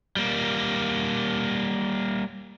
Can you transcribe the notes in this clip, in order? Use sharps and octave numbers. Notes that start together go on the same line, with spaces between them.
G3 A#3